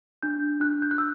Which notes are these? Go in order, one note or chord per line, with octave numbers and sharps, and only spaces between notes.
D4 G6
D4 F#6
G6
F#6
E6